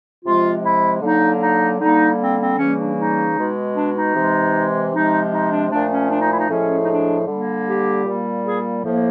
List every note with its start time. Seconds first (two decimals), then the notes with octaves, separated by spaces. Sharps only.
0.24 C3 F3 G#3 F4
0.63 E4
1.02 D3 F#3 A#3 D#4
1.41 D#4
1.80 D3 G3 A#3 D#4
2.20 C4
2.39 C4
2.58 C#3 E3 G3 A#3 C#4
2.78 D4
2.97 D#4
3.37 B2 G#3
3.76 D4
3.95 D#4
4.15 C3 E3 G#3
4.93 C3 F3 G#3 D#4
5.32 D#4
5.51 D4
5.71 A#2 F3 A3 D4
5.90 C#4
6.10 D4
6.20 D#4
6.29 E4
6.39 D#4
6.49 A2 F3 G#3 C#4
6.84 D#4
6.88 D4
7.27 D3 G3 A#3
7.66 G4
8.05 A#2 G3 A#3
8.44 G#4
8.83 A2 F3 A#3